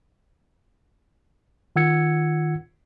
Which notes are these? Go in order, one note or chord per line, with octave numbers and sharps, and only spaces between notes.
D#3 F4 F#5 E6 G#6 C#7